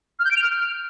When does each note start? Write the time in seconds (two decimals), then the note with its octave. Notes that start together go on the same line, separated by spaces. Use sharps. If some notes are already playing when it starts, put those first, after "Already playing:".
0.19 F6
0.25 G6
0.31 D7
0.36 F7
0.42 F6